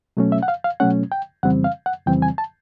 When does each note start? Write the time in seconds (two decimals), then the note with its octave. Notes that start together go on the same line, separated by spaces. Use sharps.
0.17 B2 F#3 A3 C#4
0.32 E5
0.43 F#5
0.48 F5
0.64 F5
0.80 B2 F#3 A3 C#4 F#5
1.12 G5
1.43 F2 C#3 E3 G3 C4 F#5
1.64 F5
1.86 F#5
2.06 F2 C#3 E3 G3 C4 G5
2.22 G#5
2.38 A5